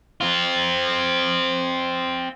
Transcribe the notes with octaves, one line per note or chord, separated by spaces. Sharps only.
C4 F4